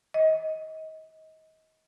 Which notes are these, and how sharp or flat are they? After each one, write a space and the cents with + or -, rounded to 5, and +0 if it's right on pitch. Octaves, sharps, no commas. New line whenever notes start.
D#5 +30